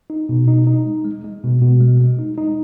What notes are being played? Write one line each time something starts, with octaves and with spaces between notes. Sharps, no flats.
D#4
B2
D#4
D#4
G#3
G#3
G#3
B2
B2
G#3
G#3
D#4
D#4